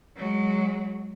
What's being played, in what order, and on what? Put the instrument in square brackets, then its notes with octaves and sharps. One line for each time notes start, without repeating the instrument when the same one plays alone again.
[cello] F#3 G#3